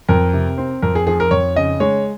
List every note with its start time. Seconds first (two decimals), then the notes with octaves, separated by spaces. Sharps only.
0.09 F2 A#4
0.33 C3
0.58 C4
0.82 F2 A#4
0.95 G#4
1.07 F3 G#4
1.20 A#4
1.31 F2 C#5
1.56 C#3 D#5
1.80 G#3 C#5